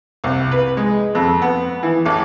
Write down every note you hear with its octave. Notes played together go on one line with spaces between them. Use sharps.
C2
B4
G#3
F2
B3
E3
A1